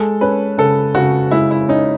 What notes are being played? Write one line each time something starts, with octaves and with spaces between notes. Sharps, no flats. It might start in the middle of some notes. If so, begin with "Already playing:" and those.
Already playing: G#3 A4
C#4 B4
C#3 A4
C#3 F#4
G#3 E4
E4
C#4 D#4